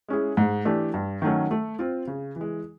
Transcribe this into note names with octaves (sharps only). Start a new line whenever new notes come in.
G#3 C#4 E4 G#4
G#2
E3 A3 D4 G4
G2
D#3 F#3 A3 C#4
A3
C4 F4
C#3
E3
G#3